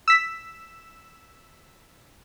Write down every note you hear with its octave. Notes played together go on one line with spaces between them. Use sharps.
E6 B6